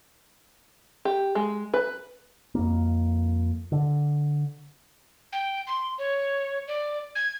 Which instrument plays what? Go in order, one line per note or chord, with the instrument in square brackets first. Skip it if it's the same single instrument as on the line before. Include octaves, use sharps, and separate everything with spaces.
[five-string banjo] G4
G#3
B4
[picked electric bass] F2 A#3
D3
[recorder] G5
C6
C#5
D5
G#6